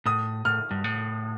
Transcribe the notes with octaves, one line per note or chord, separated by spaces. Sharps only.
A2 D#6
A2 F6
G2
A2